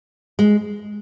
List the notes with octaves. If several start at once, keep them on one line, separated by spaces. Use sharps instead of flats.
G#3